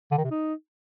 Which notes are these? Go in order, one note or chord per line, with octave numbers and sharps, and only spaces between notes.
D3
D#3
C3
D#4